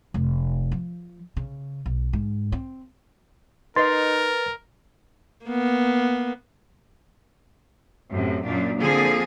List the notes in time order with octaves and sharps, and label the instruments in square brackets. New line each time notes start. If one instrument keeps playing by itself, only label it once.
[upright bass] F1
F3
C#3
B1
G#2
C4
[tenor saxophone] D#4 [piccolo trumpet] A#4 [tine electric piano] B4 A6 [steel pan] D#5 C6
[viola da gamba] A#3 B3
[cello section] F#2 A2 C3
F#2 A#2 D4
D3 F3 A#3 C4 G#4 A4